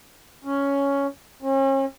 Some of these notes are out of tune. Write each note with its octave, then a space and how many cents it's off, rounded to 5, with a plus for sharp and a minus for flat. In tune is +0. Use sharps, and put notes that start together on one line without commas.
C#4 +5
C#4 -40